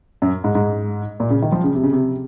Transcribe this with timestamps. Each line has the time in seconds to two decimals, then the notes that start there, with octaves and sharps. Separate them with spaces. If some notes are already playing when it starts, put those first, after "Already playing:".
0.22 F#2
0.44 G#2
0.55 G#2
1.20 A#2
1.30 C#3
1.42 D#3
1.52 F3
1.64 C#3
1.75 C3
1.83 C#3
1.93 C3